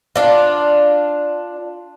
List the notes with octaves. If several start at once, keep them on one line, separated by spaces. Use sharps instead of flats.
D4 F4